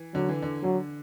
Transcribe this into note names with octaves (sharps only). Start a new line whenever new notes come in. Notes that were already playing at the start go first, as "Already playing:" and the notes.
Already playing: E3
D3 F#3
E3
D3
D3 F#3